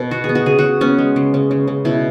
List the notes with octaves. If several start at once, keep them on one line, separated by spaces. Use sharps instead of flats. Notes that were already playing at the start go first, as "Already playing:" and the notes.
Already playing: B2
B3 F#4
G#4
B3
F#4
C#3 G#4
C#3 F#4
B3 C#4
G#3
C#3
C#3
C#3
C#3
B2 E4